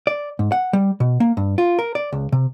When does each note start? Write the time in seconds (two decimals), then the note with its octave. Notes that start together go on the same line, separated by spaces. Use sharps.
0.07 D5
0.39 G#2
0.52 F#5
0.73 G3
1.00 B2
1.20 A#3
1.37 G2
1.58 F4
1.79 A#4
1.95 D5
2.12 C#2
2.32 C3